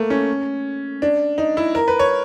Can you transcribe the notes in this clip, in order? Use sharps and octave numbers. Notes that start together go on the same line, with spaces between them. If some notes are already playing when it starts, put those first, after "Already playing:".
Already playing: A3 A#3
C#4
D4
D#4
E4
A#4
B4
C#5